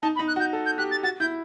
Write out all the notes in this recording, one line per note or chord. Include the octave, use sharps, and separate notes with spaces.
D#4 A5
B5
D#4
F#6
F#4
G6
A4
G6
G4 F#6
A6
F#4 A6
E4 G6